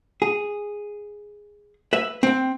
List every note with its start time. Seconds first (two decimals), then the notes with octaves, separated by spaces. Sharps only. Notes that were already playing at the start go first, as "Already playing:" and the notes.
0.22 G#4
1.93 B4 E5
2.23 C4 G5